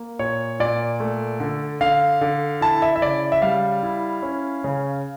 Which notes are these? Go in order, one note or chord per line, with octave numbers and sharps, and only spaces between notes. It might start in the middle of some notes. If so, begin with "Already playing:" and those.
Already playing: A#3
A#2 C#5
A#2 D5
A3
D3
D3 F5
D3
E4 A5
E5
E5
C#3 D5
E5
G3 F5
E4
C#4
C#3